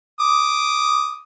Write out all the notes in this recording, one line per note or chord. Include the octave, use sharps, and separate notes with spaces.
D6 D#6